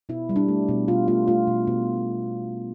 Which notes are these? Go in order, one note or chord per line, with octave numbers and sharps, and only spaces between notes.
B2 E4
G3
D4
A3
B2
B2 F4
A3 F4
A3 F4
B2
B2